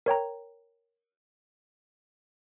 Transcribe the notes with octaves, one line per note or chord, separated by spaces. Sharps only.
A#4 C#5 G5 A#5